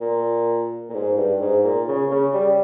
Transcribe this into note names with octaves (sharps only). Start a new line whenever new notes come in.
A#2
A#2
G#2
G2
G#2
A#2
C#3
C#3
G3